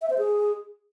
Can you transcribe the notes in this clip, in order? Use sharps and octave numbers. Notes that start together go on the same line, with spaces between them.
E5
C5
G#4